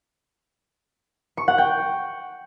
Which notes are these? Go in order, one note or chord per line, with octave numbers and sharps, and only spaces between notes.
C#6
F#5
G5